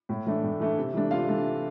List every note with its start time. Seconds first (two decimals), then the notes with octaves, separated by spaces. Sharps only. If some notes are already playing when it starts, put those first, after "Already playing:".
0.09 A2
0.26 E3 A3 D4
0.43 A2
0.60 E3 A3 D4
0.78 C3
0.94 E3 A3 D4
1.11 C3 F4 F5
1.28 E3 A3 D4